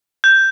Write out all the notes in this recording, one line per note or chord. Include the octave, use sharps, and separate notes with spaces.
G6